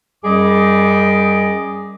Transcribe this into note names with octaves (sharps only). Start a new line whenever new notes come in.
F#2 G3 G#4 D#5 D6